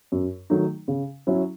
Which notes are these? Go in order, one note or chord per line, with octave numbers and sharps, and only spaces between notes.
F#2
D#3 F#3 A3 D#4
C#3
F#3 C#4 E4